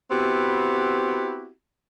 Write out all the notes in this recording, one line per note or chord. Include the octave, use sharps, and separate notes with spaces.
B3 C4 E4 F#4 G4